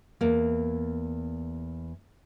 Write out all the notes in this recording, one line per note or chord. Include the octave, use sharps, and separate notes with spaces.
E2 A#3